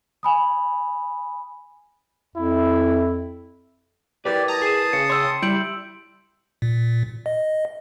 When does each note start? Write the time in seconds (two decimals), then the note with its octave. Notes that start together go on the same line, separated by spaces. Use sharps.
0.23 G#5 B5 D#6
2.36 F2 E4
4.25 E4 G4 A#4 B4 D5
4.48 A5 A#5 D#6
4.62 G#4 C7 E7
4.93 C#3 C#7
5.10 C#5 G5 C6 E6
5.42 G3 E4 G6 D7 F#7
6.62 A#2
7.26 D#5